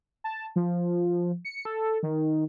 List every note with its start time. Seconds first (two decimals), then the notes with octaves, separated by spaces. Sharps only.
0.24 A5
0.56 F3
1.45 C#7
1.65 A4
2.03 D#3